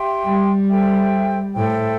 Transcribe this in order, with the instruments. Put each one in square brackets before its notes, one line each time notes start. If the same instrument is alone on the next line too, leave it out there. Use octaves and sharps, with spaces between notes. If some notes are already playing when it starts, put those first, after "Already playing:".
Already playing: [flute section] G4 E5 G5 C6
[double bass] G3
[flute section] A4 C5 E5 G5
[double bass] A2 [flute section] A4 C5 E5 G5